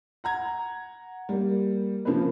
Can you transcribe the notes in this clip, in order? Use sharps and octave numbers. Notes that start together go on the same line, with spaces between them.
F#5 A#5 G#6
G3 A#3
C#3 F3 A#3 C4 B4